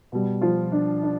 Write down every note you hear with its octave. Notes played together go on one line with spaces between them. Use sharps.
B2 G3
F3 F4
D4
D4